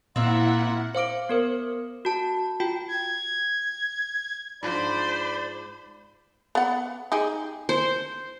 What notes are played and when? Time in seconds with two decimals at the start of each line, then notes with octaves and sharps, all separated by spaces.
0.16 A#2 A#3 C4 E4 F4 E5 F#5
0.95 C5 F5 D6 D7
1.29 B3 A#4 C5
2.05 F#4 A5
2.60 F4 F#4 G5
2.88 G#6
4.63 G#2 F3 D4 C5 D5 B5
6.55 B3 F#5
7.12 D#4 G4 G#4
7.69 C5